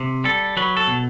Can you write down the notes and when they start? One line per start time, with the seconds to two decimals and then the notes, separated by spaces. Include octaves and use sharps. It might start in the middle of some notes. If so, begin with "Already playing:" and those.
Already playing: C3
0.24 G3 A4
0.57 F#3 B4
0.77 A4
0.87 B2